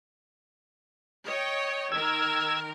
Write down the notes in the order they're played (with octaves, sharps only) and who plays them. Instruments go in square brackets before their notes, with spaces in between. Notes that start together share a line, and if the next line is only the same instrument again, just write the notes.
[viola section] C#5 D#5 G5
[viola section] D#3 A#4 [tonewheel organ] E6 G#6